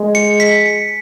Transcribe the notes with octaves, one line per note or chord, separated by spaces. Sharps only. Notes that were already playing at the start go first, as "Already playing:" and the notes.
Already playing: G#3
C#7
B6
C#7